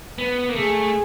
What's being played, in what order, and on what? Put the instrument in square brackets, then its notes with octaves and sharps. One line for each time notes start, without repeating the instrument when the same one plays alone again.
[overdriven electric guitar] B3
A#3
[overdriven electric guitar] A3 [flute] G#4